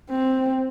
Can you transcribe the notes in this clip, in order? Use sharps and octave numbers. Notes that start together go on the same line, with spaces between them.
C4